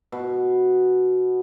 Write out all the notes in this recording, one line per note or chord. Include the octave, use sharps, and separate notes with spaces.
B2